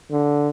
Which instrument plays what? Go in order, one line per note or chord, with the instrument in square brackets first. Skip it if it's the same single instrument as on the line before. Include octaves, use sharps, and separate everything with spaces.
[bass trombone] D3